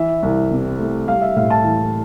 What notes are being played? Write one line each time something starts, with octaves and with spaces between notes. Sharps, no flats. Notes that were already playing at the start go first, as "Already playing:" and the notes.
Already playing: E3 E5
C2
C3
A3
G3 F5
E5
A2 F5
A5
E3